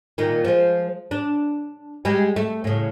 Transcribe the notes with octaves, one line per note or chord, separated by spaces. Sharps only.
A#2 D#3
F3 G#3
D4
G3 G#3
A3
A2 C#3